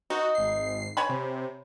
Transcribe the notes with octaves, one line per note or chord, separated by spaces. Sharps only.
D#4 F#4
G#1 C7
C#5 G#5 B5
C3